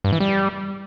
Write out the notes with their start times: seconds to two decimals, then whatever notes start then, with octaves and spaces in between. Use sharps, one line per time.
0.04 G2
0.12 E3
0.20 G3